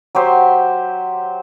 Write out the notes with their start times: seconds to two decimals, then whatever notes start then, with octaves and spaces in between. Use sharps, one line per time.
0.15 F#3 G4 C5 E5